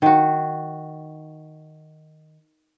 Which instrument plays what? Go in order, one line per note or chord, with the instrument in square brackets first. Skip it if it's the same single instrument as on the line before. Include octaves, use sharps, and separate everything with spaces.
[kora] D#3 F#4